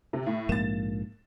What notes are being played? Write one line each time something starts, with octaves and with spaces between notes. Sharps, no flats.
C3
A2
A#1 G#2 A#3 A6 E7